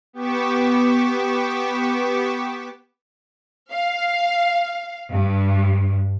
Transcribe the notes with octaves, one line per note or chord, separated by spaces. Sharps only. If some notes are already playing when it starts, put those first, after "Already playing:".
B3 G4 C#6 D6 B6 E7
F5
G2